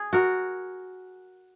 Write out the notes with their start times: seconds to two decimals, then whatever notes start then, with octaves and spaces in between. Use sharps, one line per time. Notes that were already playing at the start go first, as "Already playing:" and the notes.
Already playing: G#4
0.13 F#4 A#4